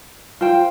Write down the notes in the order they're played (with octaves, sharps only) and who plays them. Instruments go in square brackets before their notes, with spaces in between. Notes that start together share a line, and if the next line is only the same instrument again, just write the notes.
[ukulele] F4 C5 G5